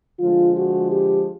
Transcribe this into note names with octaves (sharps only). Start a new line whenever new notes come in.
D3 F3 G#3 F4
F#4
G4